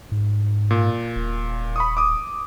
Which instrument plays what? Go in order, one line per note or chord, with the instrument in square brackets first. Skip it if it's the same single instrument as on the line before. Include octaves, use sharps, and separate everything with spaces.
[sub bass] G#2
[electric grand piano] A#2
[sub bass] D#1
[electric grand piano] B5 C#6 D#6
D6 D#6